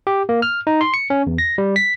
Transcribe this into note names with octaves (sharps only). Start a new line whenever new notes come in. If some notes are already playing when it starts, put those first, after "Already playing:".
G4
A#3
F6
D#4
C6
C#7
C#4
E2
A#6
G3
B6